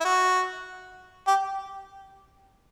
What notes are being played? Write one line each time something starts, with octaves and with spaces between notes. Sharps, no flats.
E4
F#4
G4